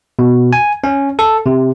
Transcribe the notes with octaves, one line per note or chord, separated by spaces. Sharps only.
B2
G#5
C#4
A4
C3